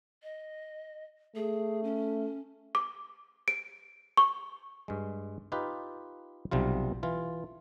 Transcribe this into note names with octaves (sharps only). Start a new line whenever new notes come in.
D#5
A3 G#4
C#4
D6
D7
C#6
G2 G#3
D#4 F4 G4 B4
B1 C3 G3 F4
E3 F4